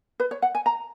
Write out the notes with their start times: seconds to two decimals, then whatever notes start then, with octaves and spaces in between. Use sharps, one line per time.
0.20 B4
0.31 C#5
0.42 F#5
0.55 G#5
0.66 A#5